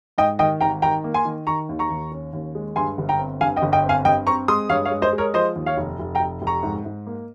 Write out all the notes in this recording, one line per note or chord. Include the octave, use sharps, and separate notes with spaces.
G#2 D#5 G5
D#3 D#5 G5
G#1 G5 A#5
D#3 G5 A#5
A#3
G#5 C6
D#3
D#3 A#5 C#6
D#2
A#5 C#6
D#2
C#4
D#2
G#3
G2 G#5 C6
G1
G5 A#5
C4
G2 F5 G#5
D#5 G5
G1
D#5 G5
C4
F5 G#5
G2 D#5 G5
C4 A#5 C#6
G#3 C6 D#6
G2 C#5 F5
C#5 F5
G#3
C5 D#5
G#3
A#4 C#5
F3 C5 D#5
D#2
C#5 F5
F1
F1
G5 A#5
F1
F1
A#5 C#6
G#2
G#2
A#3